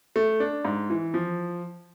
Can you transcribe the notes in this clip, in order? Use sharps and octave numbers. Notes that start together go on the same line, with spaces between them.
A3
D4
G#2
E3
F3